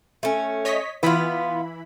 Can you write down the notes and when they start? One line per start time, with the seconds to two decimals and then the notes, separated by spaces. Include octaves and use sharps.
0.23 A3 C#4
0.65 C#5 D#5 B6
1.03 E3 B3 E4 F4 B5